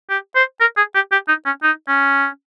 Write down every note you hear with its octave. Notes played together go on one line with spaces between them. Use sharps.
G4
C5
A#4
G#4
G4
G4
D#4
C#4
D#4
C#4